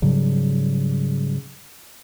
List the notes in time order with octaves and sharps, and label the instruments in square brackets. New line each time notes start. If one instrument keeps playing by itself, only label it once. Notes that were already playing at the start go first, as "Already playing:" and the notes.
[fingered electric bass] G#2 C#3 F#3 G3